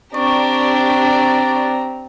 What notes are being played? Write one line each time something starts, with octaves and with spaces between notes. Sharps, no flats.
C4 D4 G4 D5 A#5 C#6